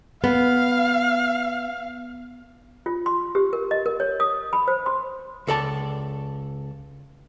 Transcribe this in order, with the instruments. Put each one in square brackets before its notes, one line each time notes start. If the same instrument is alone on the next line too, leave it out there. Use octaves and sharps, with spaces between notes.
[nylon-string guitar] B3 [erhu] F5
[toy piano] F4
C6
G4
A#4
D#5
A#4
C#5
D#6
B5
C5
C6
[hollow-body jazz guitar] C#2 A4 D5 A5